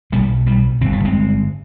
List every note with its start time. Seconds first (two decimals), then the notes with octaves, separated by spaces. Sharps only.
0.12 B1 B2 G3 B3
0.46 G3 B3
0.81 G1 G2 D3 C4
0.93 B3
1.05 G#3 C4